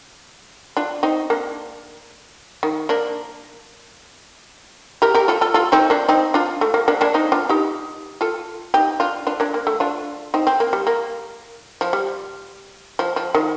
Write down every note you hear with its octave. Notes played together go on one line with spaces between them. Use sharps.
D4 F4
C4 D#4
A#3 D4
D#3
A#3 D4
G4 A#4
G4 A#4
F4 A4
F4 A4
F4 A4
C4 D#4
A#3 D4
C4 D#4
D4 F4
A3
A#3
A#3 D4
A#3 D4
C4 D#4
D4 F4
D#4 G4
F4 A4
D#4 G4
D4 F4
D4 F4
A#3 D4
A#3
A3
D4 F4
C4 D#4
C4
A#3
G3
A#3
F3
G3
F3
F3
D#3